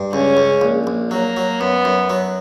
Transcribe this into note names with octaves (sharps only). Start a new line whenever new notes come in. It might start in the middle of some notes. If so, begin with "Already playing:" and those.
Already playing: G2
C#2 C#4
C#2
A#1
A#1
F#3 A#3
F#3
F#2 B3
F#2
F#3